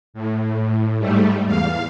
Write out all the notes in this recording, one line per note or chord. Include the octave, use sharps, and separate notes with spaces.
A2
G#2 G3 A3
E2 F5